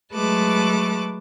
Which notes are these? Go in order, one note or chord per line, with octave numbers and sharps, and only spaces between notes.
F#3 G#3 A3 B4 A5 D6